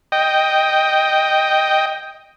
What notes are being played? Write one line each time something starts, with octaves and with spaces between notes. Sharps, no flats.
D#5 G5